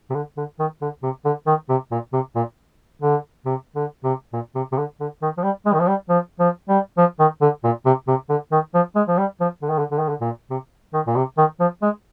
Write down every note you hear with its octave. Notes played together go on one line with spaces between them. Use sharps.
C3
D3
D3
D#3
D3
C3
D3
D#3
C3
A#2
C3
A#2
D3
C3
D3
C3
A#2
C3
C3
D3
D3
D#3
F3
G3
G#3
D#3
F3
G3
F3
F3
G3
F3
D#3
D3
A#2
C3
C3
D3
D#3
F3
G#3
F3
G3
F3
D3
D#3
D3
D3
D#3
D3
A#2
C3
D#3
A#2
C3
D#3
F3
G#3